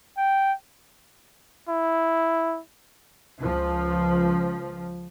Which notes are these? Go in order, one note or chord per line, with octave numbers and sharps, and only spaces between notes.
G5
E4
C#2 F3